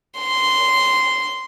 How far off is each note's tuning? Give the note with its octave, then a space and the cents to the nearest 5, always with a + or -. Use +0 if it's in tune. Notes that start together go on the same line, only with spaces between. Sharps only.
C6 -10